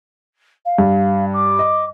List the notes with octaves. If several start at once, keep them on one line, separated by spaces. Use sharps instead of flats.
F5
G2
D6
D#5